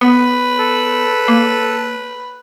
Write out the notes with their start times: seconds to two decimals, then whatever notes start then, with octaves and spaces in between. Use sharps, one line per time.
0.01 B3 B4
0.59 A4
1.28 A#3